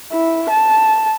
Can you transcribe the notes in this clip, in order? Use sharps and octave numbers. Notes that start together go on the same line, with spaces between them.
E4
A5